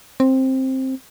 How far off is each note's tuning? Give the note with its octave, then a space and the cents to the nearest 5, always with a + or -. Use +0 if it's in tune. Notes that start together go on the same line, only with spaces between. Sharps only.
C4 +10